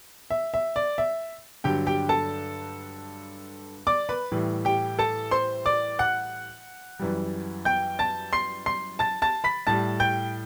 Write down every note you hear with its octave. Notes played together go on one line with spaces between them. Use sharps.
E5
E5
D5
E5
G2 D3 F#3 G4 G5
G4 G5
A4 A5
D5 D6
B4 B5
A2 E3 G3
G4 G5
A4 A5
C5 C6
D5 D6
F#5 F#6
F#2 E3 G3
G5 G6
A5 A6
C6 C7
C6 C7
A5 A6
A5 A6
B5 B6
A2 G3 A5 A6
G5 G6